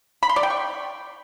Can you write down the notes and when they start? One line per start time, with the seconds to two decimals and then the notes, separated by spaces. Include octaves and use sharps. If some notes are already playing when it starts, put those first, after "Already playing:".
0.23 B5
0.29 C6
0.36 D5
0.43 G5
0.50 C#6